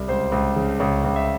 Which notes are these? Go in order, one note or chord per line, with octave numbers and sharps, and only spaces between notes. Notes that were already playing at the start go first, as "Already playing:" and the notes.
Already playing: C2
C#2 C5
C#2
C#3
C#2 C#5
C#2
E5